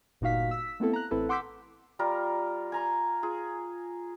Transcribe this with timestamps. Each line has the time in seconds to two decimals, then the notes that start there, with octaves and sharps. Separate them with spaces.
0.21 G1 A#2 D#4 F#4 F5 B6
0.51 E6 B6
0.80 A3 B3 C4 E4 A4
0.93 A#5 F#6
1.11 A1 C4 E4 A4 B4
1.29 F#5 C6 D6 E6 G6 B6
1.99 G3 F4 A#4
2.72 G#5 A#5 C6
3.23 F4 G#4